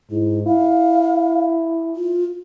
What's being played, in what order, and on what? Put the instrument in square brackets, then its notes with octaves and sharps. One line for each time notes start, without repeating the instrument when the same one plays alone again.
[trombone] G#2 [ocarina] E4
[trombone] E4 [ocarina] F5
[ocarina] F4